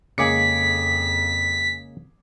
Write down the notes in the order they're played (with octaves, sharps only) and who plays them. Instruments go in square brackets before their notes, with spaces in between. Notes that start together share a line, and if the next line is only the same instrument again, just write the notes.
[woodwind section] F2 [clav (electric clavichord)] C#3 G#3 A#3 [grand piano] G#4 D6 C#7 [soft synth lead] B6